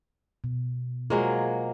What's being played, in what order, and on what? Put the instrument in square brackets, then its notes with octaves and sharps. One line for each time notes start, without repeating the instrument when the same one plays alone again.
[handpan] B2
[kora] F#3 G#3 A#3 [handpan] F4 C5